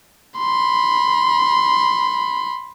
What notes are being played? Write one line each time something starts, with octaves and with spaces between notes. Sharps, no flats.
B5 C6